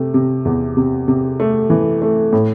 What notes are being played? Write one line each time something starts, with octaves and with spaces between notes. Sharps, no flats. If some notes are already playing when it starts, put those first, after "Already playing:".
Already playing: C3 A3
C3
E2
C3
C3
A3
E3
A3
A2